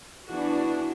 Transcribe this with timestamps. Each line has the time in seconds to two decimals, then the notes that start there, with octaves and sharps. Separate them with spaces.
0.26 E3 B3 D4 F#4